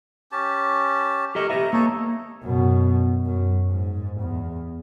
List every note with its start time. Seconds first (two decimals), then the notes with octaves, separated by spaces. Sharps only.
0.32 C#4 G4 A5
1.35 G4 A4 A#4 D#5 C#6
1.50 G4 B4 E5 A#5
1.73 A#3 D#4 A4 C#5
2.41 F#2 B2
3.25 F#2
3.70 G#2
4.21 E2